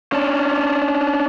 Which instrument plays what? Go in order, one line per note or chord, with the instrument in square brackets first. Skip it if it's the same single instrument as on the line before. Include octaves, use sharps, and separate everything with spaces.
[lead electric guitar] C#4 D4